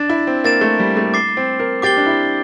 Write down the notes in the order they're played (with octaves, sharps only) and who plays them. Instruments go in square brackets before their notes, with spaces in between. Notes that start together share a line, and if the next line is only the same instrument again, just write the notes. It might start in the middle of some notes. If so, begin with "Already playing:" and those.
Already playing: [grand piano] D4 [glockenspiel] A6 E7
[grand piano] E4
C4
[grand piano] A#3 [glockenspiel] F6 A6 E7
[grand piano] A3
G3
A3
[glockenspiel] D6 A6 C7 G7
[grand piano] C4
A#4
[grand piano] G4 [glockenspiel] D6 A6 C7 G7
[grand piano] D4
E4